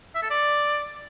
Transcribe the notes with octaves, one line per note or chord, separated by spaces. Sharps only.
E5
A4
D5